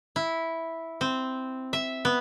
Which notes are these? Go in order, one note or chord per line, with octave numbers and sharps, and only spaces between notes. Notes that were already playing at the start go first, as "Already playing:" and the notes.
E4
C4
E5
B3